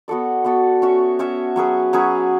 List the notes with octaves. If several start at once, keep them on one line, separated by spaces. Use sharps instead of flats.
B3 F#4 A4 D5
B3 F#4 A4 D5
C#4 F#4 C#5 E5
C#4 F#4 C#5 E5
F#3 C#4 G#4 B4
F#3 C#4 G#4 B4